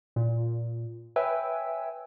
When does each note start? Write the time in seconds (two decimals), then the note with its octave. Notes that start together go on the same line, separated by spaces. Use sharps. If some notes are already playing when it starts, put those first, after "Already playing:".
0.16 A#2
1.16 B4 C#5 E5 G5 G#5 E6